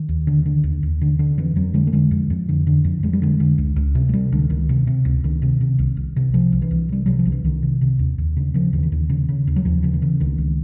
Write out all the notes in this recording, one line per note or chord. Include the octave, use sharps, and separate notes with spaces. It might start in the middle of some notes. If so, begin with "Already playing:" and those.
Already playing: D#3
D#2
D3
D3
D#2
D#2
D3
D3
F2 E3
F2 F#3
D3 G#3
A3
D3 G#3
F2
F2
D3
D3
F2
F2 G#3
G3
D3 G#3
D3
C#2
C#2
C3
G#3
C3 G3
C#2 D3
C#2 D#3
C3
C3
C#2
C#2 D#3
C3
C3
C2
C2
C3
C3 F3
C2
E3
C2
C3 G3
C3 F#3
F3
C2
E3
C2 D#3
C3
C3
D#2
D#2
C#3
C#3 F3
D#2 E3
D#3
D#2
C#3
C#3
D#2
F#3
D#2 F3
C#3 F3
E3
C#3
C#2 D#3
C#2